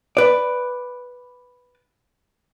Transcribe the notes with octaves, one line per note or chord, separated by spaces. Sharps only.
B4 D5